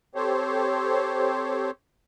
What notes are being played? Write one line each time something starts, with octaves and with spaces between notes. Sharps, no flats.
C4 G4 A4 C5 C#5